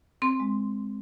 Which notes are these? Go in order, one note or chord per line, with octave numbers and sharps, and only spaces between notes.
C4 C6
G#3